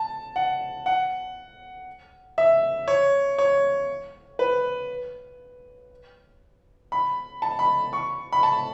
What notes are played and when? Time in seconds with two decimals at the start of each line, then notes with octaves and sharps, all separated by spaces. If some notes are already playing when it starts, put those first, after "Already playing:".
Already playing: A5
0.36 F#5
0.86 F#5
2.38 E5
2.88 C#5
3.38 C#5
4.39 B4
6.92 B5
7.42 A5
7.59 B5
7.93 C#6
8.32 B5
8.43 A5